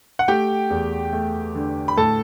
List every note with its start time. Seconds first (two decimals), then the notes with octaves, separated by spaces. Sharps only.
0.19 F#5
0.28 A3 G4 G5
0.70 E2
1.13 A3
1.55 D3
1.88 B5
1.97 A2 A4 A5